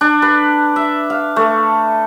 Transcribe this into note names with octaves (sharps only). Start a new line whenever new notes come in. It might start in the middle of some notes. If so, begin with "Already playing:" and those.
D4
B4
E5
F5
A3